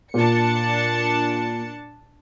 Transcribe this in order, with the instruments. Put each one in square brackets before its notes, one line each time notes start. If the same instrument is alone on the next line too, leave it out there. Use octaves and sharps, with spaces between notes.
[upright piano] A#2 [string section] D4 A5 C#7